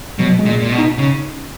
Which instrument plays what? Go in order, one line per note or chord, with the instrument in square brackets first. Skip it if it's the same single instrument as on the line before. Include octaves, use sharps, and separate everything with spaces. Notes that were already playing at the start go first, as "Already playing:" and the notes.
[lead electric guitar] B2 [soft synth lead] F#3
[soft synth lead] G#3
[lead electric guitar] A#2
A#2
B2
[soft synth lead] D#4
[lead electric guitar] C#3